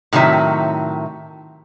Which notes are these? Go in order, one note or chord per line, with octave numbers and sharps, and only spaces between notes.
A2 C3 D#3 F#3 E5